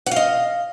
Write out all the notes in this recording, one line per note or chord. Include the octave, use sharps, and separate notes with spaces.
D#5 F5 F#5